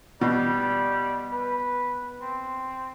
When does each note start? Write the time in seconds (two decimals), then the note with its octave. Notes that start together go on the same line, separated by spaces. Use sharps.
0.21 B2 G3
1.33 B4
2.22 C4